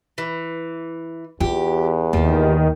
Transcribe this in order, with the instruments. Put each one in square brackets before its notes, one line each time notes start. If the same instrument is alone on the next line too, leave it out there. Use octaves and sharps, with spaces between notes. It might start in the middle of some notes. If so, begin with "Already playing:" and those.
[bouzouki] E3
[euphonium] E2 [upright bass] F4 [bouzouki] G4
[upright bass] D#2 [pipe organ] D#3 [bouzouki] F3 G4